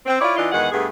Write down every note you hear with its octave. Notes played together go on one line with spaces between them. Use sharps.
C4
E4 F4 C#5 D5
E3 D4 D#4 F4
E2 D#3 G#3 F#5
G2 A3 B3 G#4